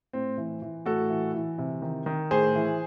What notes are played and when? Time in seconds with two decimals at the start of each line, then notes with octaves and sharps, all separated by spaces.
0.13 A2 C4
0.38 E3
0.62 E3
0.86 A2 F#4 A4
1.10 E3
1.34 E3
1.58 C3
1.82 D#3
2.06 D#3
2.31 A2 G#4 C5
2.56 E3